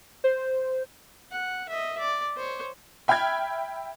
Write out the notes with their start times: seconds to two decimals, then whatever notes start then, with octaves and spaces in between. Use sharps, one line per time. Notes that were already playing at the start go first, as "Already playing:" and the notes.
0.24 C5
1.31 F#5
1.69 D#5 E5
1.99 D5
2.37 C5 C#5
3.08 E5 G5 B5 F6 G#6